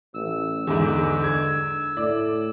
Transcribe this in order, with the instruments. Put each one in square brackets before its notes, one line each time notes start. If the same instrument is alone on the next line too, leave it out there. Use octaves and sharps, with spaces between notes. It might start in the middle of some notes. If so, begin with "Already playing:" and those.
[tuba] A1 [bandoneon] E6
[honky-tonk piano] E2 G#2 [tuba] D3
[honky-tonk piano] G#6
[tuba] A2 [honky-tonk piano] D5